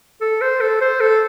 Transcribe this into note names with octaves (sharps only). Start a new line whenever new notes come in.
A4
C5
A4
C5
A4